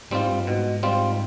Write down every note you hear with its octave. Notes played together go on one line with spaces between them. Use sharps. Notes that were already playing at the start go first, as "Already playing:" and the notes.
G#2 G3 C4 F4
G2
G#2 B2
G3 C4 F4